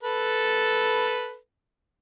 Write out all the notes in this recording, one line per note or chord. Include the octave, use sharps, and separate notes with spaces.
A4 B4